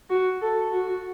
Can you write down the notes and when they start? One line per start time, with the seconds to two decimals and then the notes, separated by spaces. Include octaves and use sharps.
0.10 F#4
0.42 A4
0.72 F#4